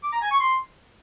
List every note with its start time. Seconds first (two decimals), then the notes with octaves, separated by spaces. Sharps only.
0.03 D6
0.13 A#5
0.22 G#5
0.31 C#6
0.40 C6